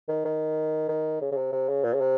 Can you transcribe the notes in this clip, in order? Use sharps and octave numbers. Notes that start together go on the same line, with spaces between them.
D#3
D#3
D#3
C#3
C#3
C3
C3
C#3
A#2
C#3
C3